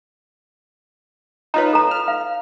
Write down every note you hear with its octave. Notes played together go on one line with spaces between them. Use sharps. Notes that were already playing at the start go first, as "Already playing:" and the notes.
D#4 F4 B4 C#5 A#5
A4 A#5
F6
F5